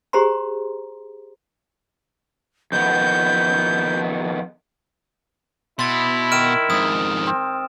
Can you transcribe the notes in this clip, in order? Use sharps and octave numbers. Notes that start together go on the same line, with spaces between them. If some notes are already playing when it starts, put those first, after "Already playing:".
G4 G#4 C5 A#5 C6
F2 D#3 B3 G6
B2 E4 C6 A6
D#3 F6 D7 E7
F2 G#2 D#6
C4